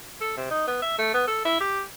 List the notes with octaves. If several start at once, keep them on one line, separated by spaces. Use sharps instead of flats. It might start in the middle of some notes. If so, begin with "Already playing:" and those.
A4
C3
D#4
B3
E5
A3
B3
A4
E4
G4